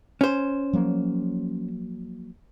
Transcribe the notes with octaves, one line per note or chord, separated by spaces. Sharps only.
C#4 C5
F3 F#3 A#3